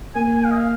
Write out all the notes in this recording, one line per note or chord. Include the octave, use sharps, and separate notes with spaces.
A#3 G#5
G#5
F5
D#5
F5